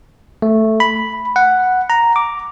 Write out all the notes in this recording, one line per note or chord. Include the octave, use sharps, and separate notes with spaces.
A3
B5
F#5
A#5
D6